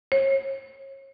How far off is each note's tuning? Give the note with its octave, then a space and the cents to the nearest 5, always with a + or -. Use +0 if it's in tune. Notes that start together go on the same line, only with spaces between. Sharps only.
C#5 -35